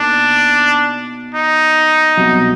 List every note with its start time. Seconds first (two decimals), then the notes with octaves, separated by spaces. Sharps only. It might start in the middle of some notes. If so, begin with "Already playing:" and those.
Already playing: B2 A#3 D4 D#4
1.35 D#4
2.17 C2 B2 F#3